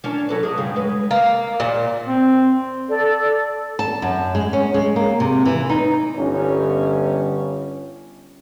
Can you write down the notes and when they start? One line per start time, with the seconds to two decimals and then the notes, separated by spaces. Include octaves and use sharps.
0.04 C#4 D4 A#4
0.29 F#3 A4 B4
0.43 G#4 A#4 D#5
0.57 F#2 C#3 G3
0.76 G#3 B4
1.11 A#3
1.60 A#2
2.08 C4
2.89 A4 D5
3.79 A5
4.02 F#2
4.35 G#3
4.53 C#4
4.74 G#3
4.96 A#3
5.20 C3
5.45 E3
5.69 D#4
6.17 G1 C#4